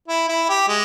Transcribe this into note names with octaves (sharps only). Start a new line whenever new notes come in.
E4
E4
G4
G#3